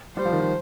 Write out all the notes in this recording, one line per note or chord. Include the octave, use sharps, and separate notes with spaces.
G3 C5
F3
D#3
F3